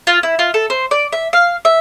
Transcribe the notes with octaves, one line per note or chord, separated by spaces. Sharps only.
F4
E4
F4
A4
C5
D5
E5
F5
E5